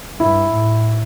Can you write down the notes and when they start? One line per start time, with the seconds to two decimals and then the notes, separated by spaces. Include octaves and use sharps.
0.19 G2 E4
0.50 A2